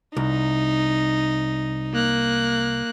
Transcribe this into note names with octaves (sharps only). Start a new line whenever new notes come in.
C2 D#4
A#3 F#6